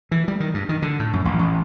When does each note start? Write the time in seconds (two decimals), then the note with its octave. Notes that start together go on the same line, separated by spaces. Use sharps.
0.11 E3
0.28 G3
0.40 D#3
0.54 G2
0.69 D#3
0.82 D3
0.99 A2
1.13 F#2
1.25 A1
1.39 A1